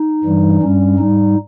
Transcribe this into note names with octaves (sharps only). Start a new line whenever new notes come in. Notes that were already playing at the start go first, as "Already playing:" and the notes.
Already playing: D#4
G2 E3 G3
G2 G3 C#4
G#2 G3 D#4